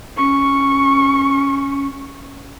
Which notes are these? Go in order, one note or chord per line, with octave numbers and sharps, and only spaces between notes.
C#4 C#6